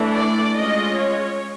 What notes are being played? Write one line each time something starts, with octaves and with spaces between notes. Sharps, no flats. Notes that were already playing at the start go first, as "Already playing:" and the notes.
Already playing: E3 A3 D4
D5
G#3 C#4 F4 D#5
C#5